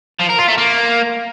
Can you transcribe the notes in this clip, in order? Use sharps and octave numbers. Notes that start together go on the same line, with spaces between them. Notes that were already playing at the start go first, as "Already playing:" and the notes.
F3
A#4
F4
A3
A#3